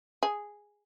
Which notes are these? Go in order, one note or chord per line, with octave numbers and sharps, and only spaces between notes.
G#4